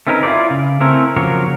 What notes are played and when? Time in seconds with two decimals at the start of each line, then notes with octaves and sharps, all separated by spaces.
0.07 A3 C4 C#4 D#4 A#4 B4
0.23 E4 F4 A4 C5 D5
0.50 C#3
0.81 A3 C4 C#4 E4 A#4
1.16 C#3 F3 F#3 A#3 A#4 C#5